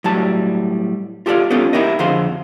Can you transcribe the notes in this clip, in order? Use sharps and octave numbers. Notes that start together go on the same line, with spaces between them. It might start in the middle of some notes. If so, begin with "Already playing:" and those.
A2 F#3 G3 A5
F4 G4 A4 A#4 D5 F5
B3 C#4 D#4 F4 G4 A4
D#4 E4 G4 A#4 D#5
F2 D3 G#4 C5 F5 C6